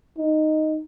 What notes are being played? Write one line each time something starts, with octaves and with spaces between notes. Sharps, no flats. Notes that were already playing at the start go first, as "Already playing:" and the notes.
D#4